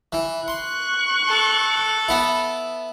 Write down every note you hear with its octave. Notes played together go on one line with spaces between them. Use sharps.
E3
C6 C#6 F#6
A4
B3 E4